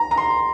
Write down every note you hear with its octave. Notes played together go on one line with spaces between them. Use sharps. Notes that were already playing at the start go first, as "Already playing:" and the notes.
Already playing: A#5
A#5
C6